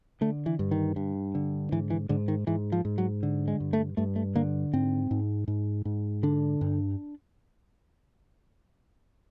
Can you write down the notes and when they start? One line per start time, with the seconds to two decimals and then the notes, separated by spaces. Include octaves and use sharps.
0.21 D3 A3
0.46 E3
0.59 G2
0.71 D#3
0.96 G2
1.35 D3
1.72 G#2 E3
1.90 E3
2.09 G#2 D3
2.28 D#3
2.47 G#2 E3
2.72 F3
2.85 G#2
2.98 F#3
3.23 D3
3.48 G#3
3.60 G2
3.73 A3
3.97 G2 A3
4.16 A3
4.35 D3 A#3
4.73 G#2 C4
5.11 G#2
5.48 G#2
5.85 G#2
6.23 D3 D4
6.61 G2